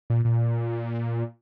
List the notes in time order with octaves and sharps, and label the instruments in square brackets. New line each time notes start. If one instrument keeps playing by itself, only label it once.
[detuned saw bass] A#2
A#2